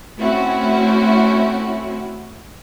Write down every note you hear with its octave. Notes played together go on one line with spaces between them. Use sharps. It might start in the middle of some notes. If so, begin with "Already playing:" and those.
A3 C4 C#4 E4 F#4